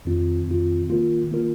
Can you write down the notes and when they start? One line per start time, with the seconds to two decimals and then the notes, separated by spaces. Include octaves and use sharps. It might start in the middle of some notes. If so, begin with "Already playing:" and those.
0.05 F2 D#3 C4 F4
0.47 F2 D#3 C4 F4
0.89 D#3 A#3 F4 A#4
1.29 D#3 A#3 F4 A#4